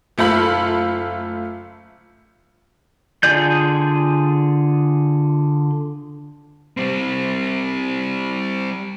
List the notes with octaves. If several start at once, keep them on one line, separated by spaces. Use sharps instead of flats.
F#1 A3 F4 B5 F#7
D3 F4 G#4 D5 G6
G3 C4